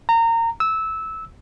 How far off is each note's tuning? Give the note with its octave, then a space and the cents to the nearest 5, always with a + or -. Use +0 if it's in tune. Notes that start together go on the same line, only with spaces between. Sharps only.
A#5 -25
E6 -15